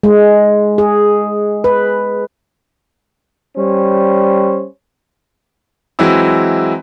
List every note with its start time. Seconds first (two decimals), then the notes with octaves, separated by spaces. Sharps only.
0.03 G#3
0.78 G#4
1.64 B4
3.58 G3 C#4 C5
5.99 E3 F#3 G#3 C4 E4